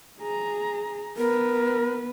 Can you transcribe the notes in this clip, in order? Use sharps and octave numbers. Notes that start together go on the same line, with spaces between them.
G#4 A#5
B3 A#4 B4